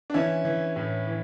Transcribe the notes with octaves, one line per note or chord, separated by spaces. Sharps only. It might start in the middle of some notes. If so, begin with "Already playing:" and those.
D4
E3 C#4 E4
E3
A2
E3